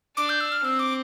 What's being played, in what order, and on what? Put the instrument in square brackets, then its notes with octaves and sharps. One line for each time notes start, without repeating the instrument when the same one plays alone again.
[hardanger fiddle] D4 [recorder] D6
[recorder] G6
E6
F6
[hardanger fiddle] C4 [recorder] E6
[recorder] D6